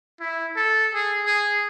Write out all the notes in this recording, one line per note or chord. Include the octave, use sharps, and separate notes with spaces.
E4
A4
G#4
G#4